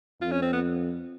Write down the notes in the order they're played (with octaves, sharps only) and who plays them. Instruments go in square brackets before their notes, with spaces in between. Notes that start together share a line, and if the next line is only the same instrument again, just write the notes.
[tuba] F2 [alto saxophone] F4
[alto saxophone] C#4
C4
B3